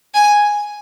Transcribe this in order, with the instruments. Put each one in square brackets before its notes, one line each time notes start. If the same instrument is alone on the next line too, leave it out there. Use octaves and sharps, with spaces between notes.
[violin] G#5